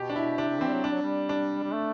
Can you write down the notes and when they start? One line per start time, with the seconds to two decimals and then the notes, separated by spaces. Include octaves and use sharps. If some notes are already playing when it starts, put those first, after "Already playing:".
Already playing: B2 G4
0.09 D4
0.16 E4
0.38 C3 D4
0.49 C3
0.60 E3 C4
0.68 G3
0.72 F#3
0.84 G3 D4
0.92 F#3
1.02 G3
1.29 D4
1.64 G3
1.73 A3